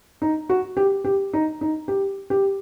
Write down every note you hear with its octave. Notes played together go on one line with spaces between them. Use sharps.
D#4
F#4
G4
G4
D#4
D#4
G4
G4